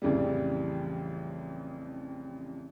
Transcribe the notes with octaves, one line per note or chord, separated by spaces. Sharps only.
A1 F2 C#3 E3 G3